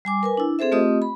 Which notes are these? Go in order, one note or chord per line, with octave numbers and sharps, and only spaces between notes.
G3 G#5 D6
A#4 B4 G#5
D4 E4
C4 G#4 A4 C5 E5
A3 C4 F4 G4 D#5 D#6
B5